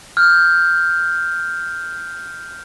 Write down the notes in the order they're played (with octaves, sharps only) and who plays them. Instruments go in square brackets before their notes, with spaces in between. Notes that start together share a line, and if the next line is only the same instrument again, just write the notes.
[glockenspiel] F6 G6